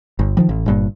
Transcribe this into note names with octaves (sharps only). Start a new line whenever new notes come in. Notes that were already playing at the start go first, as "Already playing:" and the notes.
G1
D#3 F3 G3
A1
G1 G2 A#2